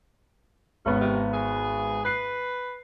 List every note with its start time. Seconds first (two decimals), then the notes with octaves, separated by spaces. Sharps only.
0.86 G#1 B3 C#4
1.01 C3
1.34 G#4
2.05 B4 F#6 C7